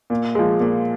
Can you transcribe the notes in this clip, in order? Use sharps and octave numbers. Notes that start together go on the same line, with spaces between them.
A#2
F3 G#3
A#2